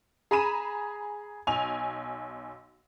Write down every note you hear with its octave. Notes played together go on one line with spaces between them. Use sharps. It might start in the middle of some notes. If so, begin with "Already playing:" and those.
G#4 A#5 B5 D#7 E7
B1 G#5 F7